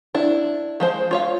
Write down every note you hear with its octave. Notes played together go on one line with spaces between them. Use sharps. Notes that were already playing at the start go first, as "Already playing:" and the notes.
D4 E4
F3 G#3 C5
F4 C#5 F5